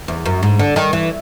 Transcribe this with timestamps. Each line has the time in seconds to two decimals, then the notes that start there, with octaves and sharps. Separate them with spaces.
0.08 E2
0.26 F#2
0.43 G#2
0.59 D3
0.76 D#3
0.93 E3